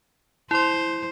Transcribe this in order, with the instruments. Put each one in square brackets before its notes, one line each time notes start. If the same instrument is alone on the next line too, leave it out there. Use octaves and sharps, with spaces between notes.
[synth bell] E4 C6 [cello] C5